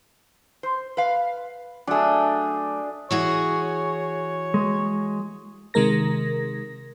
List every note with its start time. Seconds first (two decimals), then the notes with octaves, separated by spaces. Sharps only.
0.63 C5
0.97 B4 F5
1.87 F#3 A3 D4 G#4
3.11 E3 F#4 G#4 C#5
4.54 G#3
5.74 C3 D#3 G#3 A#4 A#6